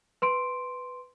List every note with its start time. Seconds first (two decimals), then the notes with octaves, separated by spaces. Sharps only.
0.22 B4 C6 D7